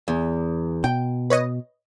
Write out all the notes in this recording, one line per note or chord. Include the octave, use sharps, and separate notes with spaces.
E2
B2 G5
B4 C#5 D#5